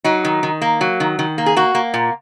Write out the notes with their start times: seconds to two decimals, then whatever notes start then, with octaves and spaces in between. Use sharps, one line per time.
0.04 F#3 D#4
0.25 D#3
0.43 D#3
0.62 A#3
0.81 F#3
1.00 D#3
1.19 D#3
1.38 A#3
1.46 G#4
1.56 A#3 F#4
1.75 A#3
1.94 A#2